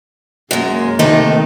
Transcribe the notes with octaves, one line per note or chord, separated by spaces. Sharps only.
F#2 G#3 A#3
C3 D#3 A3 D#4